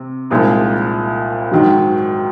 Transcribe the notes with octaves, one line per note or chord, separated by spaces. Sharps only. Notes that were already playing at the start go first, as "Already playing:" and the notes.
Already playing: C3
C2 A#2 F3 G#3 D#4
G#2 D#3 F#3